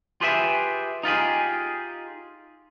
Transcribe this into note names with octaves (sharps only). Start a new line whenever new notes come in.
F4 G4 G#4 B4 D#5 E5
D#4 F4 G4 G#4